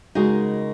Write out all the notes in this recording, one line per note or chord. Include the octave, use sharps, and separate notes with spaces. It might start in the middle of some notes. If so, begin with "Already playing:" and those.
C#3 G#3 D#4 F#4 A#4